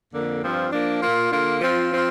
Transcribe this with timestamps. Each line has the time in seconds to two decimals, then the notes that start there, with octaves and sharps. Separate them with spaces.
0.12 F2 D3 A#3
0.42 G2 F3 C4 F4
0.72 F3 A#3 D4
1.01 A#2 A#3 F4
1.32 D3 A#3 D4 F4
1.60 F3 C4 F4
1.90 F3 C4 F4